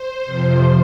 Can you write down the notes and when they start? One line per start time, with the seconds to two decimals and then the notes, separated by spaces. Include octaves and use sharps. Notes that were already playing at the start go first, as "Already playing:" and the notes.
Already playing: C5
0.24 F2 C3 F3